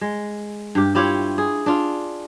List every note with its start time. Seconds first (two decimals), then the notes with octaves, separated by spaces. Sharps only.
0.01 G#3
0.75 G2 G4
0.95 E4 F4 G4 C#5
1.38 G#4
1.66 D4 F4